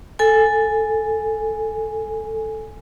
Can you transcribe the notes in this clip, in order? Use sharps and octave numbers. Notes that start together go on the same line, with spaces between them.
A4 G#5